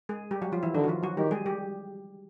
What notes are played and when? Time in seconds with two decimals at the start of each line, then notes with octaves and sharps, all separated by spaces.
0.09 G#3 G#4
0.31 G3 G4
0.42 F#3 F#4
0.52 F3 F4
0.63 E3 E4
0.74 D3 D#3 D#4
0.84 F#4
0.88 F3 F4
1.03 F#3 F#4
1.17 D#3 G3 G4
1.31 G#3 G#4
1.46 G3 G4